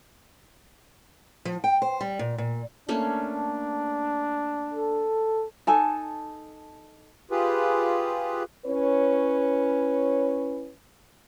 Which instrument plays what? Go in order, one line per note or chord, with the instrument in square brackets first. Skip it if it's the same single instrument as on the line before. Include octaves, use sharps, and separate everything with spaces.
[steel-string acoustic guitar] F3
G5
C5
G3
A#2
A#2
[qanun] A3 A#3 C#4 [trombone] D4
[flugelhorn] A4
[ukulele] D#4 A4 G#5 A5
[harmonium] F4 G4 G#4 B4
[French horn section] C#4 E4 B4 C#5